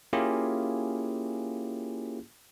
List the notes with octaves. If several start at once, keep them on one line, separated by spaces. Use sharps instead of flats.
A#3 C#4 E4 F4 G4 G#4